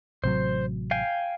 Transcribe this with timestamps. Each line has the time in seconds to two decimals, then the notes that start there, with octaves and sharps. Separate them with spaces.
0.24 A1 C3 F#3 C5
0.91 F5 G5 G#5